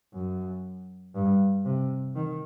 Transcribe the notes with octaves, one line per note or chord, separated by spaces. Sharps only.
F#2
G2
C3
D#3